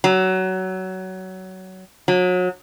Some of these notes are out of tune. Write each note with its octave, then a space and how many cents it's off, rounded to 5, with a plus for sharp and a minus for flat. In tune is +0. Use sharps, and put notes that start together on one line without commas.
F#3 +20
F#3 -30